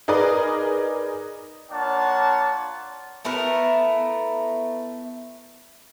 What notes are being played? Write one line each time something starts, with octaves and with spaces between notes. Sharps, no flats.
D#4 G#4 A#4 B4 D5 D#6
A#3 D4 F4 C#5 F#5 A5
A3 B3 E4 A#4